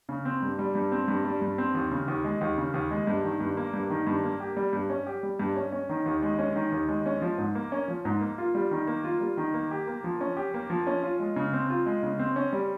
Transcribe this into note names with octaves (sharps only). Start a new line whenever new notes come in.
C#3
C4
G2
G3
G2
C4
G2
G3
G2
C4
D#2
C#3
D#2
G#3
D#2
C#3
D#2
G#3
G2
D#3
G2
A#3
G2
D#3
G2
A#3
G4
G3
G2
C#4
G4
G3
G2
C#4
C#4
D#3
D#2
G#3
C#4
D#3
D#2
G#3
C#4
F3
G#2
A#3
C#4
F3
G#2
A#3
F4
G3
D#3
A#3
F4
G3
D#3
A#3
G4
A#3
F3
C#4
G4
A#3
F3
C#4
F4
G#3
C#3
C4
F4
G#3
C#3
C4
C#4
G3